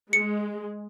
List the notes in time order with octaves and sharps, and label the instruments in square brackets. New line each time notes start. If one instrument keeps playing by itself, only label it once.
[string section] G#3 [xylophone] C#7